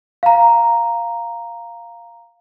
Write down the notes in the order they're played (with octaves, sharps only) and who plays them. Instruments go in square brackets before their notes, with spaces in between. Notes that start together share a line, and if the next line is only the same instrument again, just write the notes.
[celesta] F5 A#5